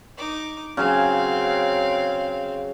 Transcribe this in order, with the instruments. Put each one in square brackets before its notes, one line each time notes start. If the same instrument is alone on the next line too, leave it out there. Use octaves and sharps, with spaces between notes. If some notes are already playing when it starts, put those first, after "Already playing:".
[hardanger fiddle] D#4 D6
[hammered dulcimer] C#3 F#3 [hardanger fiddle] C4 F5